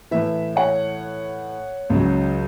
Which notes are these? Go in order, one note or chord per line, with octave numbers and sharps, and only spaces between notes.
A2 E3 B4 E5
C#5 F#5
C#2 C#3 F#3